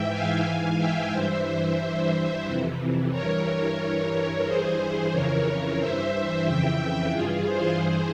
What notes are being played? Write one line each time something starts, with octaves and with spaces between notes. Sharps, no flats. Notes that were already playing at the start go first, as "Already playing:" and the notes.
Already playing: G#2 E3 E5 G5
F5 G#5
G#2 E3 F5 G#5
E5 G5
G2 E3 C5 E5
G2 E3
F2 C3 E3
G2 E3 A#4 C#5
G2 E3 A#4 C#5
G2 E3 G#4 C5
F2 C#3 E3 A#4 C#5
G2 E3 C5 E5
F2 C#3 E3 E5 G5
G2 E3 F4 G#4
G#4 C5
G2 E3